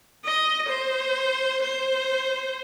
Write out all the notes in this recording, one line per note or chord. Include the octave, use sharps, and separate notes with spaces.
D#5
C5
C5